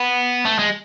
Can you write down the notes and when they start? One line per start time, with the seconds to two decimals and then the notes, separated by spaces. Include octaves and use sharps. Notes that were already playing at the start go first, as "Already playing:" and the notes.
Already playing: B3
0.45 A3
0.59 G#3